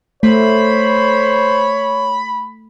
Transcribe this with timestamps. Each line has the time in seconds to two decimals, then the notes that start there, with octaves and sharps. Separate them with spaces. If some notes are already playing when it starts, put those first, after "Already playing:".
0.23 A3 C5 C#5 B5